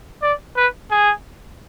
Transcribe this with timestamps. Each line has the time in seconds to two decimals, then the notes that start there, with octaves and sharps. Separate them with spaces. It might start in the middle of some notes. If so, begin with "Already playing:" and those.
0.22 D5
0.56 B4
0.91 G#4